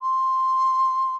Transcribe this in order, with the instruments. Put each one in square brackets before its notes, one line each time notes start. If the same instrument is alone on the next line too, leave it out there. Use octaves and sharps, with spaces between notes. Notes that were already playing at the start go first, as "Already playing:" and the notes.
[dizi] C6